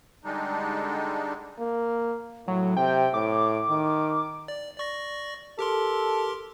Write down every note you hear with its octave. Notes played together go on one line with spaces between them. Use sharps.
D3 G3 G#3 D4 D#4
A#3
A2 F#3
C3 G5
A2 D6
D#3
D5
D5 C#6 A#6
G4 A4 A#4 C6